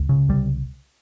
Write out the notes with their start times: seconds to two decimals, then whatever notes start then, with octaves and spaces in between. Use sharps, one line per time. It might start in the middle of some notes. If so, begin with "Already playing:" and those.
Already playing: C#2
0.09 C#3
0.29 C2 G3